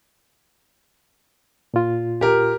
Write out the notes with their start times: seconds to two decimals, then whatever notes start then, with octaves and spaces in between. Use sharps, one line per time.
1.74 A#2 F4
2.21 G4 A#4